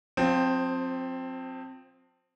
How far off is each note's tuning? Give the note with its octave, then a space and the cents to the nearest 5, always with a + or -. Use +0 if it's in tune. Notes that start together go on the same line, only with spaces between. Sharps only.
F3 +30 C4 +0